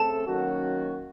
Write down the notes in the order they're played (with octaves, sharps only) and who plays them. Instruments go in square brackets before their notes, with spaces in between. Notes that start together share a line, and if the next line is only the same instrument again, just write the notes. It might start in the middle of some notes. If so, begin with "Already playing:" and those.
Already playing: [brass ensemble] C#3 A3 C4 A4 [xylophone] A5
[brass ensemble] D#3 F#3 A#3 C#4 F#4